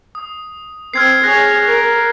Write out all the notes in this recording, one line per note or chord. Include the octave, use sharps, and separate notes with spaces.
D#6
C4 F6 G#6 C7
G#4 C#5 F#6 A#6
A#4